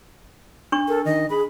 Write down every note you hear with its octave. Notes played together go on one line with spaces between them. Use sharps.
D4 C#6
A4 A#4
D#3 D#5
G#4 B5